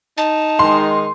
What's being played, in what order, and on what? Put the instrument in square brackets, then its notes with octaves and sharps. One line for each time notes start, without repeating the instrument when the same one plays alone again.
[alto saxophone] D#4 [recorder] A5
[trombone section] D#3 G#3 [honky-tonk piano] C6